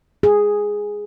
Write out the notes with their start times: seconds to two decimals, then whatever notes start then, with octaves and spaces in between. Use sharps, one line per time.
0.23 G#4